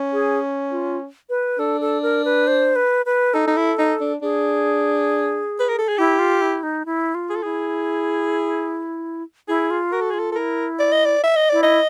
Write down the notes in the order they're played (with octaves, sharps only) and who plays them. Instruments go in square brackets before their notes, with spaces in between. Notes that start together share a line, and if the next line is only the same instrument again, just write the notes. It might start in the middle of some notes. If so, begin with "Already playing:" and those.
Already playing: [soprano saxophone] C#4
[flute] G#4
F4
B4
[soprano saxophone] D4 [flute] A4
[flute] A4
A#4
B4
C5
B4
B4
[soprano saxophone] D#4 [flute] A4
[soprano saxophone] D#4
E4
D#4
D4
[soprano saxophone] D4 [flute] G#4
[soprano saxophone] B4
A#4
A4
G#4
[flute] E4 [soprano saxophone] G4
[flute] F4
E4
D#4
E4
F4
[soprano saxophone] G#4
A4
[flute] E4 [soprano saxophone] G#4
[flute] E4 [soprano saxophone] G#4
[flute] F4
[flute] F#4 [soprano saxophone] A#4
[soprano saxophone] A4
[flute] F4 [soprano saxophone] G#4
[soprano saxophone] A4
A4
[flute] E4 [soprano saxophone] A#4
[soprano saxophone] D5
D#5
D5
E5
D#5
[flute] E4 [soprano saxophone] D5
[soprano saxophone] D#5